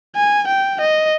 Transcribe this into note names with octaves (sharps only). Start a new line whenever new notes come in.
G#5
G5
D#5